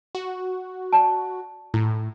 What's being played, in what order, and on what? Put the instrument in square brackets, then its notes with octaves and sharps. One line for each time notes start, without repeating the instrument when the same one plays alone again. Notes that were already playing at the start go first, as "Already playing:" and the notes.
[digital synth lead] F#4
[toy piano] D5 A5
[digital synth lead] A2 [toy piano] E4